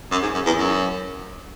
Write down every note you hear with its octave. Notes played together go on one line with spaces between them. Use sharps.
F#2
G#2
F#2
E2
F#2